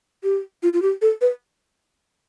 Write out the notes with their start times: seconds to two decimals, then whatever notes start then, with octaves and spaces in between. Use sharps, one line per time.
0.24 G4
0.63 F4
0.73 F4
0.82 G4
1.02 A4
1.21 B4